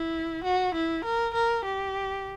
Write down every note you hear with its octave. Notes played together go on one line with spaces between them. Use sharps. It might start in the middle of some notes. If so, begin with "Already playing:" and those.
Already playing: E4
F#4
E4
A#4
A#4
G4